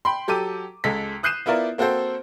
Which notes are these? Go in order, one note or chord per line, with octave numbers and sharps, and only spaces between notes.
G5 B5 C6
F#3 G4 A4 D6 D#7
C#2 G#3 A4 B6
D#6 F#6 G6 C7 D#7 E7
B3 E4 F4 A#4 D5
A#3 C4 F#4 A4 C5